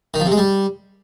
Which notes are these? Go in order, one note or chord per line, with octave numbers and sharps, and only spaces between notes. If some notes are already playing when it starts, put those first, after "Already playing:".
D#3
F3
C3
G#3
G3